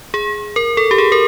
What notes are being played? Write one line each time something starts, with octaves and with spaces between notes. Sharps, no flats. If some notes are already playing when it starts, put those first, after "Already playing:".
G#4
A#4
A4
G4
G#4
A#4